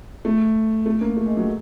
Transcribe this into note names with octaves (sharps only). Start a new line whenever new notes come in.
A3
A3
A#3
A3
G#3
F#3